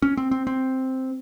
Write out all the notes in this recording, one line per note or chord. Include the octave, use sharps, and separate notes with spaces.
C#4
C4
C4
C4